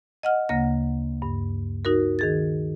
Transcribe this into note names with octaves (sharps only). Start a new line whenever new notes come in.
D#5 F#5 F6
D2 C#3 A#3 A#6
G2
D#4 F#4 A#4
D#3 G#4 A6